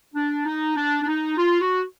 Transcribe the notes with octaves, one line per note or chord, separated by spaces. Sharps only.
D4
D#4
D4
D4
D#4
F4
F#4